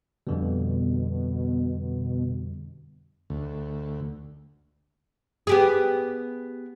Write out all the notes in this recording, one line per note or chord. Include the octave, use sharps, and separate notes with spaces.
F2 B2 D3 G3
D2
B3 G4 G#4